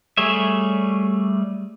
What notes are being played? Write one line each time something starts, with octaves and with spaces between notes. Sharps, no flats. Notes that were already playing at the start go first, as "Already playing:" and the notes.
G3 A3 G#4 C#5 E5